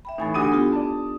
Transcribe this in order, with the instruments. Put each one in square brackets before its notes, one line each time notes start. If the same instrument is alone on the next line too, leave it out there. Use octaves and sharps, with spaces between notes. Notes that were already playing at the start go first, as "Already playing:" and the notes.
[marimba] E5 G5 B5
[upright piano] A2 E3 [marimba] D#4 G#5 A6
[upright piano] D2 D#6 D#7 [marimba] D4 G4 A4
[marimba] B3 F4 G4
[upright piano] D5 A5